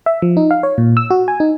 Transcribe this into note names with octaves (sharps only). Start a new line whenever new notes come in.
E5
F3
D#4
F5
C#5
A#2
E6
F#4
G#5
D#4